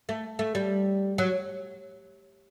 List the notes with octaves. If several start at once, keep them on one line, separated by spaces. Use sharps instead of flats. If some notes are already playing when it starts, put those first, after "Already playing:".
A3
A3
G3
F#3